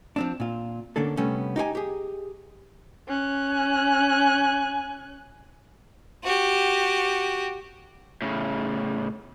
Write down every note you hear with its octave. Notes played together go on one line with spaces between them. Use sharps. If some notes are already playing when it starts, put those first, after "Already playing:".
F3 C4 D4
A#2 F4
D3 A#3 C#4 D4 A4
C3 G3 A3 B3 C#4
D#4 G4 C#5 G#5
G4 G#4
C#4 F#6
G#5
F#4 G4
A2 C#3